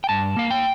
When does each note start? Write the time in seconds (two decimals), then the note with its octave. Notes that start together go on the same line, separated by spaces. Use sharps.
0.04 G5
0.09 G2 A5
0.37 A#3 F5
0.51 G5